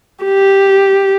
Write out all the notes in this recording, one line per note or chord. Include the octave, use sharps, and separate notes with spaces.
G4